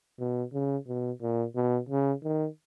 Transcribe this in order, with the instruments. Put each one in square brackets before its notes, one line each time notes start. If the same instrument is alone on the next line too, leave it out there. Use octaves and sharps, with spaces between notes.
[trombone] B2
C#3
B2
A#2
B2
C#3
D#3